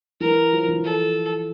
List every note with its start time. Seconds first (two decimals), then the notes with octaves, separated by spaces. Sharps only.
0.21 E3 A#4
0.53 F3
0.68 E3
0.84 A4